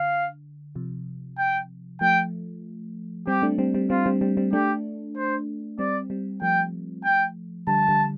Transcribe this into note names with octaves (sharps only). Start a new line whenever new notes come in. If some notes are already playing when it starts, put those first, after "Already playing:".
Already playing: D3 F5
C3 F3
G5
F3 A3 G5
G3 C4 G4
A3 D4
G3 C4
G3 C4
G3 C4 F4
G3 C4
G3 C4
G3 C4
A3 D4 G4
C5
G3 C4 D5
G3 C4
F3 A3 G5
G5
D3 G3 A5
D3 G3